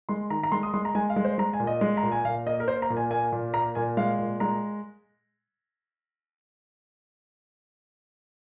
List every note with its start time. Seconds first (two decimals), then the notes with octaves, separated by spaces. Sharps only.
0.09 G#3 C6
0.30 D#3 A#5
0.43 A#5
0.52 G#3 C6
0.63 D#6
0.74 G#3 C6
0.85 A#5
0.95 G#3 G#5
1.10 F5
1.16 G#3
1.25 C5
1.38 G#3 A#5
1.53 G#5
1.60 A#2
1.67 D#5
1.81 G#3
1.97 A#5
2.03 A#2
2.12 G#5
2.25 A#2 F5
2.46 A#3 D#5
2.60 A#4
2.68 A#3 C5
2.82 A#5
2.90 A#2
2.97 G#5
3.11 A#3 G#5
3.32 A#2
3.53 A#3 A#5
3.75 A#2 G#5
3.97 G#3 F5
4.19 A#2
4.40 G#3 A#5